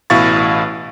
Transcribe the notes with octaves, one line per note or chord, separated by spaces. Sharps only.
A1 B2 E4 F5 C#6 A6